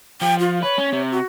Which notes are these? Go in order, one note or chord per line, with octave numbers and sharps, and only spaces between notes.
F3 G5
F4
B4 C#5
C#4
C3
F#4